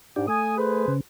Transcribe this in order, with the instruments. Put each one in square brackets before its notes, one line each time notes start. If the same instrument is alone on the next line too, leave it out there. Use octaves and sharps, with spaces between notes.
[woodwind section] G#2 [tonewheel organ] D4 G4
[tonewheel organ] A3 [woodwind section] G#5 D#6
[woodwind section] G#4 B4 C5
[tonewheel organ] C#3